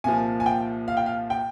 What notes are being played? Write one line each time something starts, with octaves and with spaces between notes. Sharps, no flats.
C2 A#2 F3 G#5
G#5
G5
F5
G5
F5
G5